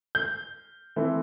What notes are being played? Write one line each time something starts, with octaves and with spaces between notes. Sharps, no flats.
G6
E3 A3 C4